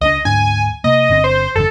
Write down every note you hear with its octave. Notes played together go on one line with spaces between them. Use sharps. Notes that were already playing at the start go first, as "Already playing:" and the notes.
C#2 G3 D4 D#5
D2 G#2 D4 G#5
C3 A#3 D#5
G1 D3 C4
C5
G1 F2 D3 A4